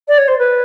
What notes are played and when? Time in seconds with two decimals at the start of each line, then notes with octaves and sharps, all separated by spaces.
0.08 D5
0.17 C#5
0.28 C5
0.38 B4